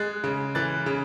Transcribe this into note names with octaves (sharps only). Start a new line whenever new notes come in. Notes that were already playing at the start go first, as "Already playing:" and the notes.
Already playing: G#3 F#6 A6
C#3
E3 F#6 A6
C#3